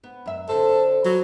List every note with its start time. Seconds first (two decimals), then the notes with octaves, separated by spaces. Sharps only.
0.04 B3
0.26 F#2 E5
0.49 D3 C4 A4
1.05 F#3 B3